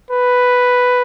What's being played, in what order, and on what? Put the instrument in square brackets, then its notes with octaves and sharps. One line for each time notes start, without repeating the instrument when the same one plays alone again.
[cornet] B4